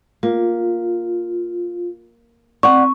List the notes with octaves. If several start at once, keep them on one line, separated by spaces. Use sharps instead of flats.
A#3 F4
C4 D5 F#5 C#6